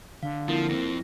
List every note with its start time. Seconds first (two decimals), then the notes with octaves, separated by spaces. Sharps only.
0.23 D3 F5
0.48 F3 A#3 C4 E4 A#4
0.69 F2 C4 A#6